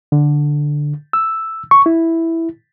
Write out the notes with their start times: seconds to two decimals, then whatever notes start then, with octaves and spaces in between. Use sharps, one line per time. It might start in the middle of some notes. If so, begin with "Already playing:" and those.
0.12 D3
1.13 E6
1.71 C#6
1.86 E4